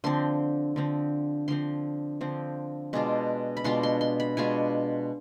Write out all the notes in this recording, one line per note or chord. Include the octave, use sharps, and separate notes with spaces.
D3 F3 C4 C6
D3 F3 C4
D3 F3 C4 C6
D3 F3 C4
B2 G#3 D4 F4
B5
B2 G#3 D4 F4 C6
C6
C6
B5
B2 G#3 D4 F4 G#5